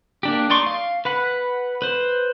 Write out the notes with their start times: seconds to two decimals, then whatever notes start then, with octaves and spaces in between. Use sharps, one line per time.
0.23 A#3 D4 G4
0.50 D#4 D5 C6 C#6
0.67 F5
1.05 B4 F#5 B5
1.82 B4 C5